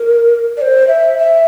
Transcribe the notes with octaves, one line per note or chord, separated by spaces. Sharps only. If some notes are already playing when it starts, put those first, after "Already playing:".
Already playing: A#4
D5
C5
E5
E5